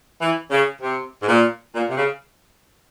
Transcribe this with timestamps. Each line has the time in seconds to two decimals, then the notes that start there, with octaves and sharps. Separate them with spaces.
0.20 E3
0.50 C#3
0.82 C3
1.21 G#2
1.27 A#2
1.74 A#2
1.89 C3
1.96 C#3